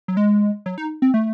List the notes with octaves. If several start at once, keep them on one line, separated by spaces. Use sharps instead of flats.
F#3
G#3
F#3
D#4
C4
A3